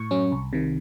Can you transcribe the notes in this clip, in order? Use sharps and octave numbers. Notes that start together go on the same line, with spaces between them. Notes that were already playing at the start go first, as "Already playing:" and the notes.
Already playing: A2 C#6
F#3 C#4
C2
C3 D#3